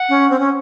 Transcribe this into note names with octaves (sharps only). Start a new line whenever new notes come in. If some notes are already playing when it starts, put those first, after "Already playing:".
Already playing: F#5
C#4
C4
C#4